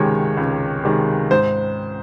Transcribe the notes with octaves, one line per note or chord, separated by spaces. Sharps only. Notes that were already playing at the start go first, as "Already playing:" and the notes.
Already playing: C#2 C3 D#3 G#3 C#5
C#2
C3 D#3 G#3
G#2 C5